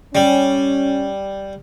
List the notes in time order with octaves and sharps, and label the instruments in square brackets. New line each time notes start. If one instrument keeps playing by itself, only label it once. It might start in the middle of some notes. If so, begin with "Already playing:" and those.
[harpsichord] G3 [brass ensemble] C#4